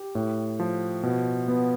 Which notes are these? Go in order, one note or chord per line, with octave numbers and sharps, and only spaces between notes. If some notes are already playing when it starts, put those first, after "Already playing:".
Already playing: G4
A2
F3
B2
B3